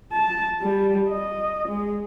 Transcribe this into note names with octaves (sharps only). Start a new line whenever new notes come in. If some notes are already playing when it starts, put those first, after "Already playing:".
A5
G3
D#5
G#3